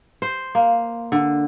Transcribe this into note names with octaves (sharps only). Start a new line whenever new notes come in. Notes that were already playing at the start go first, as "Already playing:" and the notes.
C5
A#3
D3